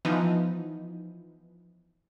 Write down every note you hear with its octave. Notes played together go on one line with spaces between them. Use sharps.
E3 F3 B3 D#4